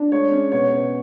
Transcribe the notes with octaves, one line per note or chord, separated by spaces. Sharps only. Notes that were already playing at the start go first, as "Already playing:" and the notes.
Already playing: D4
G#3 C#5
C#4
B2 C#5
B2